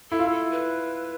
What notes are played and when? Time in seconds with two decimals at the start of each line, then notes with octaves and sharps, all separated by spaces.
0.10 E4 A4
0.19 F4
0.26 E4 A4
0.51 B4